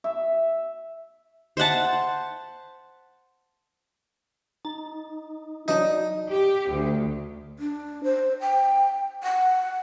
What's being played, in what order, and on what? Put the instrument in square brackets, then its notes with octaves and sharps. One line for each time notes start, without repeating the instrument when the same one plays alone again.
[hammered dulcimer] E5
[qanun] C5 E5 F#5 A5
[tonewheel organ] D#4 [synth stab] A6
[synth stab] E3 F#3 D4 [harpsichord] D#4
[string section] G4
D2
[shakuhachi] D4
C5
G5
F#5